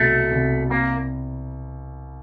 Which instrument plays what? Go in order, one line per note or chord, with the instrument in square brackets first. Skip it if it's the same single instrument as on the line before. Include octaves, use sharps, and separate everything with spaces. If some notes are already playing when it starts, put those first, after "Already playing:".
Already playing: [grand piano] C2 B2 F#3 [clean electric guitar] A3
[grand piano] C2
[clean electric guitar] A#3 [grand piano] C4